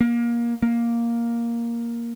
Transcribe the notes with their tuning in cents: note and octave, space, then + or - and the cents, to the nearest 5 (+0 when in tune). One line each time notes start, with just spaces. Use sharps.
A#3 +20
A#3 +5